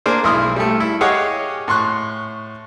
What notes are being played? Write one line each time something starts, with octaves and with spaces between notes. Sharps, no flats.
A#3 D4 G#4 C5
B1 G#3 E4 C6 D#6 F6
G3 A3
E4
G4 G#4 C#5 D#5 F5 F#5
A2 C6 C#6 F#6